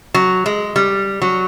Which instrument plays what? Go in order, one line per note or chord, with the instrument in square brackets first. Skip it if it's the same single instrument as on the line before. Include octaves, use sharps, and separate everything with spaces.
[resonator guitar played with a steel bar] F#3
G#3
G3
F#3